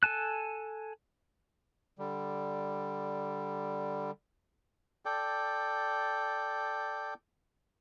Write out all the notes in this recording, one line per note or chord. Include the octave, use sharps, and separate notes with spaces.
A4 G#5 A5 F#6
D3 G3
A4 D5 G5